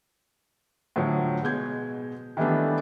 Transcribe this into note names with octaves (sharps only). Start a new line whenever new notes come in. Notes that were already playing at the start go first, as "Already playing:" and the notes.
A2 D3 F3 F#3
B2 G#3 G6 G#6
D#3 E3 G3 A3 B3 D4